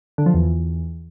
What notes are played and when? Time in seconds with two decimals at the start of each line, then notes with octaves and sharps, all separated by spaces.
0.18 D3
0.26 F3
0.34 E2